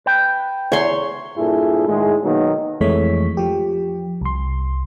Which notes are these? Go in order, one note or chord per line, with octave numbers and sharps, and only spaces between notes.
B4 G5
E2 C#5 C6
G2 A#2 E4 G#4 A4
A2 D#3 G#3
B2 D#3 F#3 A#3 D#4
F2 E3 G#3 A3 C#5 B6
F3 G4
C2 C6